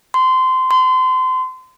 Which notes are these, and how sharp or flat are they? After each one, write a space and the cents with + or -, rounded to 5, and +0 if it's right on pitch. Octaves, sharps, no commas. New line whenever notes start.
C6 -20
C6 -30